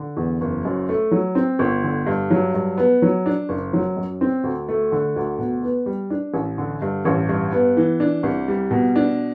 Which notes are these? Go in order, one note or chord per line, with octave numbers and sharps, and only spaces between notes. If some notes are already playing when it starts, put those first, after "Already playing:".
Already playing: D3
E2
F#1
F#2
A3
F#3
C4
G1
D3
G2
F#3
G2
B3
F#3
D4
F#1
F#3
F#2
C4
D2
A3
D3
D2
B2
B3
G3
D4
A1
D3
G2
A1
G2
B3
E3
D4
C2
G3
B2
D4